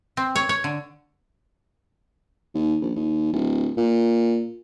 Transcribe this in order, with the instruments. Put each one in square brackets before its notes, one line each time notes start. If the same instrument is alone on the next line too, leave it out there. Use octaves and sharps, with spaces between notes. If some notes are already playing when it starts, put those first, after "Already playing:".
[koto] C4
C#5
C#5
D3
[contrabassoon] D#2
A#1
D#2
D1
A#2